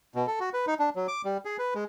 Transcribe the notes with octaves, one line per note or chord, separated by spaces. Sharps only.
B2
A4
F#4
B4
D#4
D4
F#3
D6
G3
G#4
B4
G#3